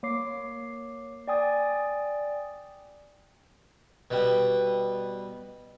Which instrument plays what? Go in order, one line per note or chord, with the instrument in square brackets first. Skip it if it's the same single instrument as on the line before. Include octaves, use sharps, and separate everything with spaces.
[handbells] A#3 C#5 D6 C7
D5 G5 G#5 D#6 A6
[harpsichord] B2 G3